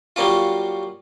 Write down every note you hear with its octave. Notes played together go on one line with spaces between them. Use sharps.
F#3 G3 A#3 C#4 F4